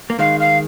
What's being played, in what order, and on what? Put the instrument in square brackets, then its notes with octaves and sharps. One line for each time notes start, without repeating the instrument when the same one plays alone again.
[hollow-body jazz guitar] A#3
[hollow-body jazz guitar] D#3 G#3 [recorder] F5
[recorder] F5